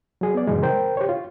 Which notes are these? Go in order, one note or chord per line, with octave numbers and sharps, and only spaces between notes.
F#3 G#4
B3 D5
F#2 A#2 C#3 E3 F#3 G#3
A#4 C5 G5
G4 C5 C#5
F4